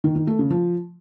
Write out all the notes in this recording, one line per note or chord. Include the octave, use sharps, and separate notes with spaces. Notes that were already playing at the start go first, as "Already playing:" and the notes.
D#3
D#3
A3
C#3
F3